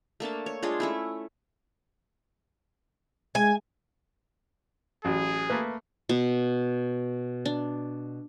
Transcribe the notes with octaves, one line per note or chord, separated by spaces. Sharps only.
A3 A#3 D4 A5
C#5
G#3 D4 F4 G#4
A3 C#4 E4
G#3 G#5
A1 F#3 G#4
A3 A#3 B4
B2
D4